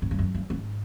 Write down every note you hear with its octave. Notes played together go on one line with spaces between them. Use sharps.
G#2
G2
F#2
G2
G#2